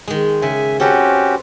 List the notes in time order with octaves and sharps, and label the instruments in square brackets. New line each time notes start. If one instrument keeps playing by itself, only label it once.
[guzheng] D#3 G#3
[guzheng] C#3 [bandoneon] E5 G#5
[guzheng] C4 A4 B4 [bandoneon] C#4 F#4 G4